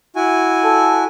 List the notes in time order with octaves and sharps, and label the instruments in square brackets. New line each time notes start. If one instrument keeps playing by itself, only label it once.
[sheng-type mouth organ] E4 F#4 G#5
[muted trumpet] A4